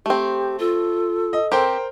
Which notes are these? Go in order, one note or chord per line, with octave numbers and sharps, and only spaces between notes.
A3 C4 G4
F4 A4
D#5
C4 G4 A#4 C5 G5